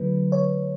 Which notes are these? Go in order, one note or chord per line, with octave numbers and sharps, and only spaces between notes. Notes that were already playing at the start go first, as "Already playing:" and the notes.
Already playing: D3 F#3 A3 B4
C#5